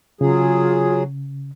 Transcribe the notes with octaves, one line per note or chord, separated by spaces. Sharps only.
C#3 F#3 F4 G#4